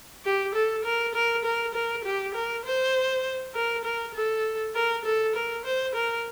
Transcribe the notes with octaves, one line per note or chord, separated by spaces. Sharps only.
G4
A4
A#4
A#4
A#4
A#4
G4
A#4
C5
A#4
A#4
A4
A#4
A4
A#4
C5
A#4